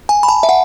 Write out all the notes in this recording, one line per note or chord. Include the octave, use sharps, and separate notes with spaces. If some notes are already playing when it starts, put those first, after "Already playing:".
G#5
B5
A5
E5
F#5